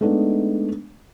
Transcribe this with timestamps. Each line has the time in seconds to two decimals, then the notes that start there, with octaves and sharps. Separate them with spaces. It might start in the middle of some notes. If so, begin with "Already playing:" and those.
0.01 G#3 A3 B3 D4 D#4